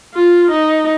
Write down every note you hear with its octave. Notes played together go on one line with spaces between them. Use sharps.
F4
D#4